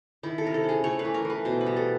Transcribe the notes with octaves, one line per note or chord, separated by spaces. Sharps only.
D#3 E4
A4
C3 A#4
A4
C#4
G#4
A3 C#5
B4
E3
A#4
E3 B4
B2 C5
B4
G3
A4